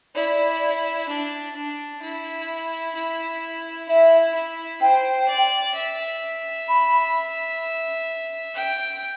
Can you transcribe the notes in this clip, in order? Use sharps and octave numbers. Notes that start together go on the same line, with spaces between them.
E4 D5
D4
D4
E4
E4
E4 E5
E4
C5 G5
D5
E5
B5
G5